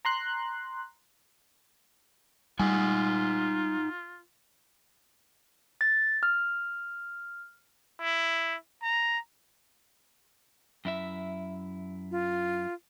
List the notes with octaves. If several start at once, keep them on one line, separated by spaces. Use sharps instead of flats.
A#5 C6 F#6
G3 D#4 F4 F#5 G#5
A6
F6
E4
A#5
F#2 E4 E5
F4